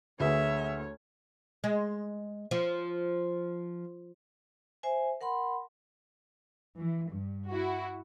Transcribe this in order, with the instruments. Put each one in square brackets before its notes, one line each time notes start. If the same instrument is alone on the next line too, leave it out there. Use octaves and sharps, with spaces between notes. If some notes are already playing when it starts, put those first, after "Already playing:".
[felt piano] D2 G#4 B4 [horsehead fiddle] A3 C#5 [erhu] E5
[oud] G#3
F3
[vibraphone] C5 E5 G#5
A#4 F#5 B5 C6
[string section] E3
G2
E4 F#4